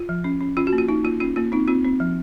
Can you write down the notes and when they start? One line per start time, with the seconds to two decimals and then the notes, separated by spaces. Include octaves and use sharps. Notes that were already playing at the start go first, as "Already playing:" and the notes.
Already playing: F4
0.09 F3
0.24 C#4
0.40 C#4
0.57 C#4 F4
0.67 F#4
0.73 A#3
0.78 F4
0.88 A#3 D#4
1.04 A#3 F4
1.20 C#4 F4
1.36 A#3 F4
1.52 C4 D#4
1.68 C4 F4
1.85 C4
2.00 F3